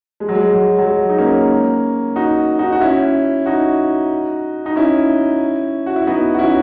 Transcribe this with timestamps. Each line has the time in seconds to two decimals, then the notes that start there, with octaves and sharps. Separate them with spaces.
0.20 G#3
0.29 F#3
0.35 G#3
0.53 F#3
0.78 F#3
0.85 G#3
1.09 D#4
1.18 A#3 C#4
2.16 D#4 F#4
2.59 D#4 F#4
2.72 F#4
2.81 C#4 E4
3.46 D#4 F#4
4.66 D#4
4.76 C#4 E4
5.86 F#4
5.96 E4
6.07 B3 D#4
6.34 F#4
6.39 C#4 E4